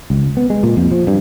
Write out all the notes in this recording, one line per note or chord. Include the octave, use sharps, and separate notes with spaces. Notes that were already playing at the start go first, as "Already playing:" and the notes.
C#2
B3
G#3
A#2
F2
F3
G2